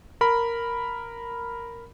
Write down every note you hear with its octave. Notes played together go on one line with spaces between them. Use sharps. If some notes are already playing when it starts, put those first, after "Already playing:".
A#4 B5